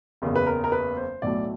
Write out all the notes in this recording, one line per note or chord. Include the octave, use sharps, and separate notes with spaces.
F#1 E2 C#3
B4
A#4
A#4
B4
C5
B1 A2 F#3 A3 D5